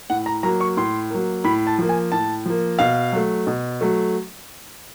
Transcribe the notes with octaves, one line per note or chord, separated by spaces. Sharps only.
A2 F#5
A#5
F#3 A#3 A#5
C#6
A2 C6
F#3 A#3
A2 B5
A5
F3 A#3
G#5
A2 A5
F3 A#3
B2 F5
F#3 A3
B2
F#3 A3